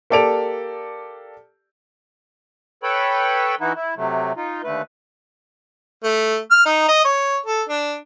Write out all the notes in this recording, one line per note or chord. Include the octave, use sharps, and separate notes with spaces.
A#3 G4 A4 D5 D7 F7
A4 B4 C#5 G5 B5
E3 D#4 E4 F#4
E4
C3 F#3 A3
D#4 F4
D#2 D3 A3 B4
A3
F6
D#4
D#5
C#5
A4
D4